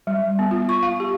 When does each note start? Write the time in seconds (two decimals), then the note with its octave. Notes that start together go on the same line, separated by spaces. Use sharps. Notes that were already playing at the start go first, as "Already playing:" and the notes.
0.07 G3
0.39 B3
0.51 F4
0.69 C#6
0.83 F5
1.00 G4